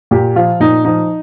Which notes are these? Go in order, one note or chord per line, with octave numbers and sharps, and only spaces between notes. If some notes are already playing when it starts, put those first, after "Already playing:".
A#2 G4
F3 F4
A#2 D#4
F3 D#4